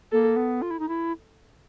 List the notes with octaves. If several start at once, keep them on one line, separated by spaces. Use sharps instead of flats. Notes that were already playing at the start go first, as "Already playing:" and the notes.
A#3 A4
B3
F4
E4
D#4
E4